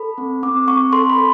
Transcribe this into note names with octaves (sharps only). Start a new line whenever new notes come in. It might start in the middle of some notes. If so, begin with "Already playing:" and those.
Already playing: A4 B5
C4
C4 D6
C4 C#6
A4 C6
B5
A4